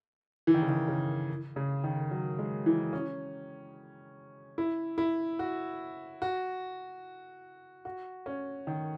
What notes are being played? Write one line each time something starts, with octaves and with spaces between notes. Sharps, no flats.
E3
D#3
C#3
D#3
C#3
C#3
D#3
F#3
G#3
E3
C#4
E4
E4
F#4
F#4
F#4
C#4
D#3